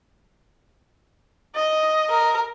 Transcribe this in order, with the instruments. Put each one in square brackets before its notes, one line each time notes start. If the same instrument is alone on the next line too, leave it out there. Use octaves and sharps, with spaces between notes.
[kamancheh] D#5
[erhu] A#4